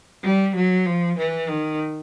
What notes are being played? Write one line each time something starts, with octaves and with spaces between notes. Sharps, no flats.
G3
F#3
F3
E3
D#3